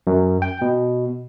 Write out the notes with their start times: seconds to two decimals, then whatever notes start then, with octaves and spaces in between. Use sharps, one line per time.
0.07 F#2
0.42 G5
0.61 B2